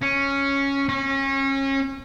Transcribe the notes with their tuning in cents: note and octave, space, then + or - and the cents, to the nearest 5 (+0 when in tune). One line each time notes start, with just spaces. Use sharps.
C#4 +0
C#4 -30